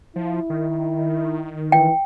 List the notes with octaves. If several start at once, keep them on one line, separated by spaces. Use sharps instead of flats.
F3 E4
D#3
E3 G5